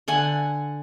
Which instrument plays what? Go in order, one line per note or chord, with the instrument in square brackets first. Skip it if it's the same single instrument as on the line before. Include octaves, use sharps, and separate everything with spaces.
[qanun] D3 F#5 G#5